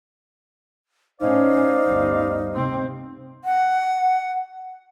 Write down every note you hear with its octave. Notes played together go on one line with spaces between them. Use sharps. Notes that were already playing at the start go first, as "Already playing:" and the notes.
A2 C#4 D#4 C5 D5 F5
G1 D2 G3
C3 C4
F#5